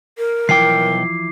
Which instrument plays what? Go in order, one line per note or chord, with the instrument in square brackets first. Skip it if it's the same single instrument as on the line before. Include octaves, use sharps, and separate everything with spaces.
[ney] A#4
[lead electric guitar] B1 G5 [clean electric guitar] E3 F3 E4 [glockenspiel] D6 C7